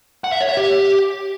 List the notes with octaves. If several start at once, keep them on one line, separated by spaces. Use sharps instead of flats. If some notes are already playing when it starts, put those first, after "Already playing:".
F#5
E5
C#5
E5
G4